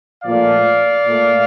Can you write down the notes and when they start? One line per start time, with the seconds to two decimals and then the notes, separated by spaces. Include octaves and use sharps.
0.23 A#2 F3 A3 D5 F5
1.05 A#2 A3